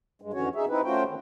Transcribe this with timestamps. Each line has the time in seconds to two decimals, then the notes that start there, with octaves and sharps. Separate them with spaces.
0.22 G2 G#3
0.33 F2 D3 E3 C#4 F#4 C#5
0.55 D#4 G#4 E5
0.69 C4 D#4 E4 B4
0.84 A3 C#4 F4 F#4 C5 G5
1.07 D#3 C4